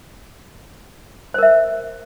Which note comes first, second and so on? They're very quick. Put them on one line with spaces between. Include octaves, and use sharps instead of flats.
C5 A#4 E5